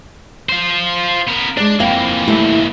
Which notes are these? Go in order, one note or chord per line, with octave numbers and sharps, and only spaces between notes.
F4 C5
B3 A#4
G#3 D4 D5
F2 E3 A#3 F5 G5
G3 A3 E4